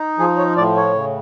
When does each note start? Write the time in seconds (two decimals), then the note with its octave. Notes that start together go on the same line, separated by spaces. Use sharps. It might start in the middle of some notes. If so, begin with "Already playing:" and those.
Already playing: D#4
0.19 F3 G#4
0.37 C#5
0.56 A2 D5
0.76 C#5
0.95 C#3